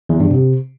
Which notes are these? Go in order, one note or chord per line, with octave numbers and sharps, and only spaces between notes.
E2
G2
C3